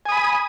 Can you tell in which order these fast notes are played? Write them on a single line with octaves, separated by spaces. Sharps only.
G#5 D#6 B5